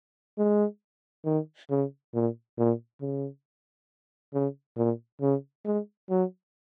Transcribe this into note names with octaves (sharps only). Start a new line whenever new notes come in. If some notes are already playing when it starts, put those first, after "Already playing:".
G#3
D#3
C#3
A#2
A#2
C#3
C#3
A#2
C#3
G#3
F#3